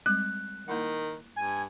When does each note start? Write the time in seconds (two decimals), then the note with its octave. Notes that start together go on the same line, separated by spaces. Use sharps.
0.06 G3 G#3 C4 F#6
0.68 D#3 A#3 E4 F#5
1.36 G2 G#5